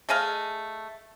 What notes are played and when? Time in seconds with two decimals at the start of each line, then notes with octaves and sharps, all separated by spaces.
0.09 A3 G#4 D#5 F5